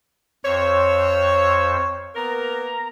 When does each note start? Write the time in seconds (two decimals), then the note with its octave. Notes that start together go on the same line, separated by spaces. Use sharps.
0.45 F2 C5 C#5 E6
2.15 A#3 B3 A#4 A#5